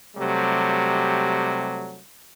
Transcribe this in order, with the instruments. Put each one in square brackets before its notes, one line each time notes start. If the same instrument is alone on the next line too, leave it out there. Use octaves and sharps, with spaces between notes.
[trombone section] C3 F#3 G3 A3